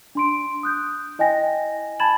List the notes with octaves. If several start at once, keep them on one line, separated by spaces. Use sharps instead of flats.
D4 C6 D7
D#6 F#6 G6
E4 D#5 G5 G#5 A#6
A5 B5 G#6 A6 E7 F#7